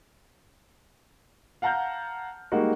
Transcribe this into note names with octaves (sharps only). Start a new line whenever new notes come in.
F5 F#5 A5 A#5 F6 G6
G3 G#3 A#3 D#4 F#4